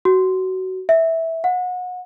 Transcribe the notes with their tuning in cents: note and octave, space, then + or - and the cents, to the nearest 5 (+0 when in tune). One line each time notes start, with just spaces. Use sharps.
F#4 +20
E5 -10
F#5 -30